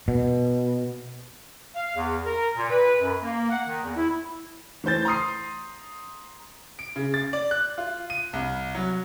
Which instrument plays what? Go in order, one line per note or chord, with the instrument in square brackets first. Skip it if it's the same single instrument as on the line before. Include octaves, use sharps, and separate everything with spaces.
[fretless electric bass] B2
[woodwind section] F5
E2
A#4
A#2
B4
F#2
A#3
F#5
D#3
E2
E4
[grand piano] E3 A3 C5 G6 A6
A#5 C6 D#6 C7
D7
C#3
A6
D5
F#6
F4
D#7
C2
F#3